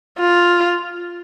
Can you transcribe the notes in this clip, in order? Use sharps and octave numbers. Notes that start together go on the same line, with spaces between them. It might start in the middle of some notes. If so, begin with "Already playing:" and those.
F4